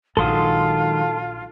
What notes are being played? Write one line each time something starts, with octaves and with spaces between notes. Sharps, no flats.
A#1 D#3 F#3 G#3 F4 A4 C6 D#6